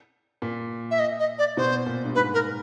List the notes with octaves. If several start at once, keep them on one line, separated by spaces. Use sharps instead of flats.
A#2
E5
D#5
D#5
D5
B2 C5
A#2
G2
G#2 B4
A#4